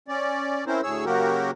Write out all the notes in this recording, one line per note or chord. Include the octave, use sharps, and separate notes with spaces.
C#4 D5
C4 C#4 E4 A#4 C5
D2 A2 G#4 C#5 E6
C#3 F#3 A#3 F#4 G4 A#4